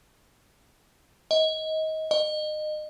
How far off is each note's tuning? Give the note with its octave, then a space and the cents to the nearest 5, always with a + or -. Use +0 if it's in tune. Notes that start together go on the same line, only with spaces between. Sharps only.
D#5 +25
D#5 -25